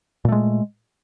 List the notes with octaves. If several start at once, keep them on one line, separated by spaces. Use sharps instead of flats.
A#2 G#3 A3